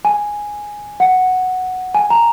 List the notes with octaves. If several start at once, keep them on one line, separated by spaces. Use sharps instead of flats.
G#5
F#5
G#5
A#5